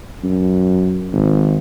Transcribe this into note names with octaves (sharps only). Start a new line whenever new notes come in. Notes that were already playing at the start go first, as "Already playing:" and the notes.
F#2
G#1